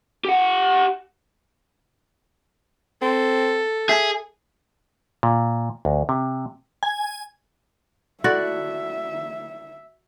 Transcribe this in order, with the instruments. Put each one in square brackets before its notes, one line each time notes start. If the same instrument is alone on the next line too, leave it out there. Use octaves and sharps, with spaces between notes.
[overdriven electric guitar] G4 F#5
[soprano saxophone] C4 [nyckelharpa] A4
[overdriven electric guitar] G#4 [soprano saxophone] E5
[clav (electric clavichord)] A#2
D2
C3
[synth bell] G#5
[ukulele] E4 A4 D5 [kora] F#4 [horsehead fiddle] E5